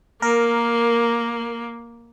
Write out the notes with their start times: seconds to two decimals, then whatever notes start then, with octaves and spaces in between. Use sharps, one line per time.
0.22 A#3 A#4